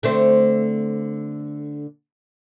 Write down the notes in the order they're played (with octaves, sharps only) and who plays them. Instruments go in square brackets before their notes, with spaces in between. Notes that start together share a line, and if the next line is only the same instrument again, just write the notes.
[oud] D3 A3 C4